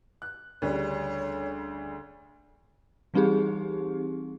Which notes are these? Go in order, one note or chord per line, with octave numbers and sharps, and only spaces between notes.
F#6
D2 C#3 G3 C#5
E3 G3 C4 D#4 G4 G#4